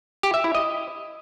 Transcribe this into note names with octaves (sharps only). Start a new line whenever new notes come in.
G4
E5
E4
D#5